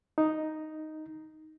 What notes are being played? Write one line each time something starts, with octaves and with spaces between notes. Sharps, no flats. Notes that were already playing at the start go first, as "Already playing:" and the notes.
D#4